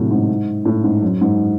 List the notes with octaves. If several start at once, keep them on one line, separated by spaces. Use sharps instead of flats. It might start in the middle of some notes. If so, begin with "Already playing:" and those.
Already playing: A2 C3 F#3
G#2
A2
G#2
F#2
G#2